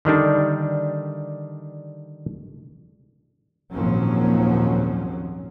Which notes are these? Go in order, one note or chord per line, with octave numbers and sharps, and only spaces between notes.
D3 D#3 G3 D4
G#1 D#2 A#2 F3 F#3 C#4